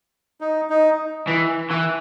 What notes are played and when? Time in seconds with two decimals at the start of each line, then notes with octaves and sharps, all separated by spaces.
0.41 D#4
0.70 D#4
1.27 E3
1.71 E3